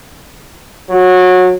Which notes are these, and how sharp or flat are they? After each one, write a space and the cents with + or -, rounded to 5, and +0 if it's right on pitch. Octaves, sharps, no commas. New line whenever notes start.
F#3 -20